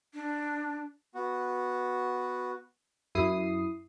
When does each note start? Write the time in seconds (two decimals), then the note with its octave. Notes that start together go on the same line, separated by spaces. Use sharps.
0.14 D4
1.15 B3 F#4
3.15 F#2 E4 D#6 C7